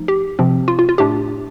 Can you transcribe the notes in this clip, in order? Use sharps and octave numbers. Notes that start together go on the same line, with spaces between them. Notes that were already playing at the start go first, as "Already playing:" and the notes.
Already playing: F3 A3 D#4
G4
C3 F3 C4
F4
F4
F4
A2 A3 D4 G4